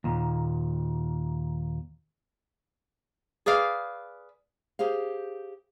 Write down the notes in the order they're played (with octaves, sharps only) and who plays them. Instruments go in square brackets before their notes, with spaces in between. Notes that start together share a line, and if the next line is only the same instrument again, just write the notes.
[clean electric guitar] D#2 A#2
[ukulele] G#4 B4 D5 F5
[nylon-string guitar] G4 G#4 C5 F5